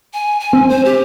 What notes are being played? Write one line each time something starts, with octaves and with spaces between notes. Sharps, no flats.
G#5
G#5
C4
C5
G4